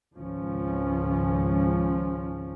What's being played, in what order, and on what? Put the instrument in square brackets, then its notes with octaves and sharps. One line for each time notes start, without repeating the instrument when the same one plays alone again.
[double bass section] G#1 C#2 F3 C#4